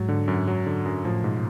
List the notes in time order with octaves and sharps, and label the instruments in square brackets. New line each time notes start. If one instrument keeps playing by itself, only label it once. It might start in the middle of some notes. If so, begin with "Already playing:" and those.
Already playing: [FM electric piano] G#2 [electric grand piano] F#3
[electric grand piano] D3
F#2
F#3
D3
F#2
[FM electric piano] A2 [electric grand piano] F3
[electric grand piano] G#2 [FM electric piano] B2